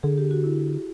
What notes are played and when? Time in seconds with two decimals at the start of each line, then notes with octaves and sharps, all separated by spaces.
0.03 D3 G#4
0.18 G4
0.31 F#4
0.44 E4